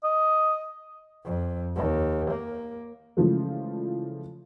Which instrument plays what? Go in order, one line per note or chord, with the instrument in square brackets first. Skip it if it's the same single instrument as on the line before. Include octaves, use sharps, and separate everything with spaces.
[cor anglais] D#5
[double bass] F2
D#2
A#3
[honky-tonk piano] C#3 E3 F3 G#3 A3